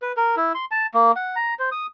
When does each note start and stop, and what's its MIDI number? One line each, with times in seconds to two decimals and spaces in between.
0.02 0.12 71
0.17 0.35 70
0.37 0.52 64
0.55 0.65 84
0.71 0.87 81
0.94 1.12 58
1.16 1.36 78
1.36 1.54 82
1.59 1.70 72
1.72 1.86 87